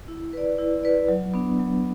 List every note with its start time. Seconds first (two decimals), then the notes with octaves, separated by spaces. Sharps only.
0.08 E4
0.33 B4 D5
0.58 E4
0.83 B4 D5
1.09 F#3
1.34 B3 D4
1.59 F#3